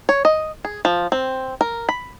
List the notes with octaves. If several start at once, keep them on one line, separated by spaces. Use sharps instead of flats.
C#5
D#5
G#4
F3
C4
A#4
B5